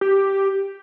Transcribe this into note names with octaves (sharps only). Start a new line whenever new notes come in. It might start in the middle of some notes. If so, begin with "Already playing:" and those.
G4